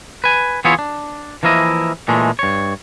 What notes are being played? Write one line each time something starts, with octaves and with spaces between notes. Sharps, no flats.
B4 G#5
E3 B3 E4 F4 G#4 C#5
D4
E3 F3 A#3 E4 D#5
A#2 E3 G#3 A3
G2 C#5